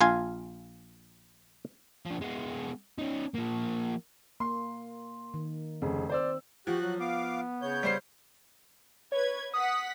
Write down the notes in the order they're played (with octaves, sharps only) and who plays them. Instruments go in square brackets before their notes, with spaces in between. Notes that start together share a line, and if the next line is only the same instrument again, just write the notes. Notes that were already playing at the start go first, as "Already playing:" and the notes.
[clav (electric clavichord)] A#1 F4 F5 G#5
[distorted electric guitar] F3 D4
G#3 B3
C#4 D#4
F3 A#3
[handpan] A#3 [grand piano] C6
[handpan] D#3
[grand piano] F1 C#3 [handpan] C4
[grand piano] C5 D5 E6
[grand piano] F3 [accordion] F#4 F#6 [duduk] G4
[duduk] F#3
[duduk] B3 [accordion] F5 D6
[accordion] C#3 C#5 G6
[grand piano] G3 C5 C7
[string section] B4 G#6 [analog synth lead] C#5
[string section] F#5 B6 [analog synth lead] D#6